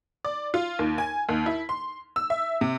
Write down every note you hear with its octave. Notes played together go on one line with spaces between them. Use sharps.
D5
F4
D#2
G#5
D#2
E4
C6
E6
E5
C3